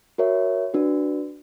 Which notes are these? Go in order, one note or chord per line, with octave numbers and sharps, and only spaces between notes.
F#4 A#4 C#5 E5
D4 F#4 B4